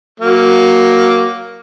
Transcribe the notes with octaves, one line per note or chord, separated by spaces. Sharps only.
F#3 A#3